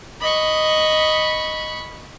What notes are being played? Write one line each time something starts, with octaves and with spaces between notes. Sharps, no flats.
D#5 B5 C#6